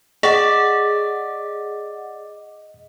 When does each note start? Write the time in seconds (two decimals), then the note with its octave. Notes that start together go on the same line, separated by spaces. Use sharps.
0.23 G#4 D5 D#5 F#5